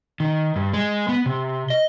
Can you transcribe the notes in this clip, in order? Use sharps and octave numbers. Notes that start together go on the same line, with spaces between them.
D#3
G2
G#3
B3
C3
D#5